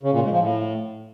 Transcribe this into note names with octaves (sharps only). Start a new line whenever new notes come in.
C#3
A#2
G#2
F3
A2